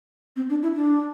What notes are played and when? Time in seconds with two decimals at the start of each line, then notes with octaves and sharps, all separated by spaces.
0.36 C4
0.49 D4
0.62 E4
0.76 D4